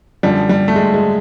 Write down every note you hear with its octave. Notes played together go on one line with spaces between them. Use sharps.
F#2 D3 F3 G3
G3
A3
G#3
G#3